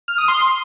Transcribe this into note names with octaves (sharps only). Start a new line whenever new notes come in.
F6
D#6
C6